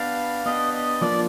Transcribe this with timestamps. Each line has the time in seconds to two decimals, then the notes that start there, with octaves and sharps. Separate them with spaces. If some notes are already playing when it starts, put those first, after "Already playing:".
Already playing: B3 D4 G4 F5
0.45 B3 D4 G4 D#5
0.74 D#5
1.01 F3 A#3 D4 F4 D5